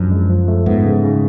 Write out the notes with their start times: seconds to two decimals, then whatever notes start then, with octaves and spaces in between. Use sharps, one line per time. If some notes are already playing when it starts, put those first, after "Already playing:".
Already playing: F#2 F3 D4
0.11 G#3
0.29 F3
0.48 A3
0.66 G#2 B3
0.85 C#3
1.04 C#3